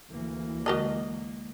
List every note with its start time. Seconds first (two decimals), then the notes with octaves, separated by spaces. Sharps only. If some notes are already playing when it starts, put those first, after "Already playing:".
0.11 D2 E3 A#3
0.66 D3 G#3 F#4 A#4 D#5